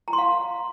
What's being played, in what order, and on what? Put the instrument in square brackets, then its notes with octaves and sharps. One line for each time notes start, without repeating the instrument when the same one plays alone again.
[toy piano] A#5
C6
F5